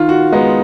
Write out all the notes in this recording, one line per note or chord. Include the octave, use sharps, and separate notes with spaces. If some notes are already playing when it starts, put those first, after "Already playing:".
Already playing: D#3 F4
F#4
G#3 B3 D#4